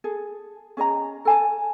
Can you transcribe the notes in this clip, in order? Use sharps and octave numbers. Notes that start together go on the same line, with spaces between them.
G#4 A4
C#4 G#4 D#5 A#5
A4 G#5 A5